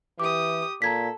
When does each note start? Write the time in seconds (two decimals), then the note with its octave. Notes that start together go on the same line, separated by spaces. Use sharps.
0.20 E3 G4 D6 D#6
0.82 A#2 A4 A#5 G#6 B6